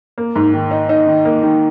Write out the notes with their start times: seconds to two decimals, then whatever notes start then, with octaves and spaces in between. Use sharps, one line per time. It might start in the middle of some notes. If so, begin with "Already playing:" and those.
0.18 A#3
0.36 G#2
0.54 D#3
0.71 D#4
0.89 D#4
1.07 D#3
1.25 A#3
1.43 D#3